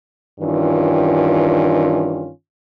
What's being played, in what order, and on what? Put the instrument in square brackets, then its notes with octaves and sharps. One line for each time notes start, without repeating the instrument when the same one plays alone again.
[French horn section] G2 D#3 E3 C#4 F4